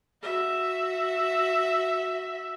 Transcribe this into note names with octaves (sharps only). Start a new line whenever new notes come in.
F#4 E5